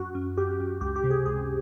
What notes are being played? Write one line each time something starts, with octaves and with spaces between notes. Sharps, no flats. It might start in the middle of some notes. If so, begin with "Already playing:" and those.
Already playing: F#2 F#4
F#2
F#2 G4
F#2
C#2 G4
G4
C3
G#4
C#2 G#4